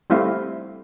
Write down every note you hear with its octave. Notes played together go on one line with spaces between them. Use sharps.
G3 A3 C4 E4 C5 F5